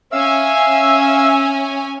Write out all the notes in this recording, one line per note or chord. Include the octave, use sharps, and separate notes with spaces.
C#4 E5 F5 G#5 E6